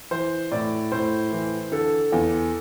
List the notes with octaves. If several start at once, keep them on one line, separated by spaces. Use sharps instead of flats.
E3 C5
A2 D5
A2 C5
E3
D3 A4
E2